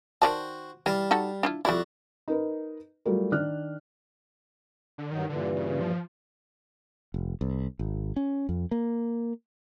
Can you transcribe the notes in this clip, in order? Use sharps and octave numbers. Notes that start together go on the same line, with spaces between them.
D#3 F#4 C5 D5 G5 A5
E3 G3 F5 A5
D#4 F#4 A4
D4 E4 F4
F2 G3 E4 F#4 D5
D#4 A#4 B4
F#3 G3 A3 F4 A#4
D#3 D4 F6 F#6
D3
G2 D#3 F#3 D#4
G2 A#2 D3 E3
C#3
F3
F1
C2
G#1
C#4
F2
A#3